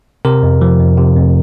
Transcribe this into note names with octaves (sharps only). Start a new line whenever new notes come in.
C3 A#4
F2
F3
F2
C3
F2